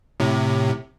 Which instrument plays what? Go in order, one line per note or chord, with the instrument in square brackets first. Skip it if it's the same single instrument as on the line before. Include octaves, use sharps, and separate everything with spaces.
[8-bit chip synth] A2 C3